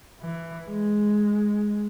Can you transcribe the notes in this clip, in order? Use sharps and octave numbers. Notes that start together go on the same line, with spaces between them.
E3
G#3